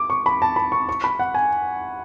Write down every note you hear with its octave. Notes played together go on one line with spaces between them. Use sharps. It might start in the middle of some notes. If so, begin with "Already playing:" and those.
Already playing: D6
C#6
B5
A5
B5
C#6
C#6
B5
F#5
G#5